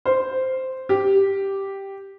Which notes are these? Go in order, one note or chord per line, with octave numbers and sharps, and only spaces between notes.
C5
G4